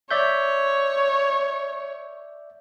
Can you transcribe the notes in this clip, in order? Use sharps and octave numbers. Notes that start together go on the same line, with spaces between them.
C#5 D5 E5 G6